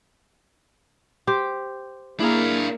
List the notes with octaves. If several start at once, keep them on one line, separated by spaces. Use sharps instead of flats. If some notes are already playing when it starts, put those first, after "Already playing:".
G4 C5 G5
A#3 D4 E4 G#4 F5 A#5